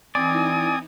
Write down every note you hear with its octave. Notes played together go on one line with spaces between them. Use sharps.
E3 C4 D#4 E4 D5 G#5 D#6